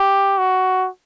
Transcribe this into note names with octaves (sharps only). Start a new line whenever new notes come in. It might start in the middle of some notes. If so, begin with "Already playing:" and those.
Already playing: G4
F#4